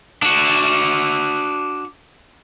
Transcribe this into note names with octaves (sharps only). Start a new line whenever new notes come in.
D4 F#4